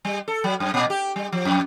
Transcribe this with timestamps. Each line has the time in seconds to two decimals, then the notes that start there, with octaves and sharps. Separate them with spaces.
0.05 G3
0.28 A4
0.44 F#3
0.60 F#2
0.74 A#2
0.90 G4
1.16 G3
1.32 F3
1.45 F2